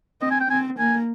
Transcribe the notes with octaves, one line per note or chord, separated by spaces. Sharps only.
C4 D#5
G#5
G5
C4 G#5
A#3 G#5